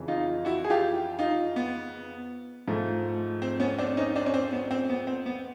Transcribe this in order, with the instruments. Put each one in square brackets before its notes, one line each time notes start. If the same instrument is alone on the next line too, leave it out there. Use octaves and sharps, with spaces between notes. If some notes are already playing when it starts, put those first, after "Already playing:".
Already playing: [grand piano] F2 C#3 E3
D#4 F4
E4 F#4
G#4
F4 G4
D#4 F4
B3
G#2 F3 A3
C4
B3 C#4
C4 D4
C#4 D#4
C4 D4
C#4
C4
B3
C4
B3
C4
B3